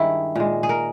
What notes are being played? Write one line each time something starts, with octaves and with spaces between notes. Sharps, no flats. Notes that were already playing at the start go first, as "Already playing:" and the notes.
Already playing: G2 D#3 G#3 E4
A#2 G#3
G#4
A#4